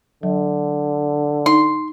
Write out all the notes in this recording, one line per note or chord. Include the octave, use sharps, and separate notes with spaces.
D3 F#3
D#4 C6